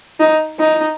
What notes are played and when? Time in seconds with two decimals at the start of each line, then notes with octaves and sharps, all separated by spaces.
0.20 D#4
0.59 D#4